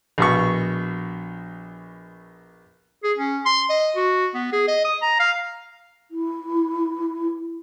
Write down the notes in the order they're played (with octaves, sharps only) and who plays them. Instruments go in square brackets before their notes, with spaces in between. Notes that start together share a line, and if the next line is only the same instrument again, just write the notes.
[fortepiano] A#1 B2 C#6
[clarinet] G#4
C#4
C6
D#5
F#4
B3
G#4
D#5
D#6
A#5
F5
[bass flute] E4